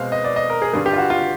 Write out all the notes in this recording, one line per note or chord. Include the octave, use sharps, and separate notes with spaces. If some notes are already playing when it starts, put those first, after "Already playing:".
Already playing: B2 G#3 C4 F5
D#5
D5
D#5
A#4
G#4
G2 D3 G3 G#4
G4
F4
F#4
F4